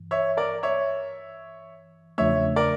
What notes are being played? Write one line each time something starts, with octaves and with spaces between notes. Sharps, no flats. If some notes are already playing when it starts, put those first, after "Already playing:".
Already playing: G2 E3
C#5 E5
A#4 D5
C#5 E5
E2 C#3 F3 A3 D4 C#5 E5
A#4 D5